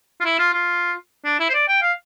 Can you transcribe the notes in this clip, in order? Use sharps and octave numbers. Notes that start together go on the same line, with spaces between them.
F4
E4
F4
F4
D4
E4
C5
D5
G5
F5